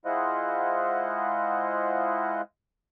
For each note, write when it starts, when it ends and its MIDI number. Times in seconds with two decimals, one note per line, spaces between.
0.05 2.41 56
0.05 2.41 64
0.05 2.41 65
0.05 2.41 72
0.05 2.41 75
0.05 2.41 78